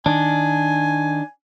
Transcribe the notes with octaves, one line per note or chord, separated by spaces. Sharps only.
D#3 D4 G#5